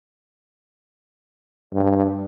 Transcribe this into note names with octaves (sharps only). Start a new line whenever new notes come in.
G2